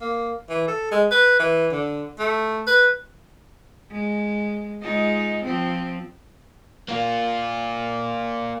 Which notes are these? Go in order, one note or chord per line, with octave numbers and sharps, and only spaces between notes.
A#3
E3
A4
G#3
B4
E3
D3
A3
B4
G#3
G#3 D#4 F4
F3 C4
A#3 F4